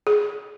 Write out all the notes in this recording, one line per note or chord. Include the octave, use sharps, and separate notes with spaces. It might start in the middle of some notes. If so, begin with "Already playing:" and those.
G#4